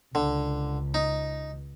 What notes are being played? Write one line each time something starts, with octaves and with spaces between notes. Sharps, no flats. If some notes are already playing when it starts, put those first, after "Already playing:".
C#2 D3
D#4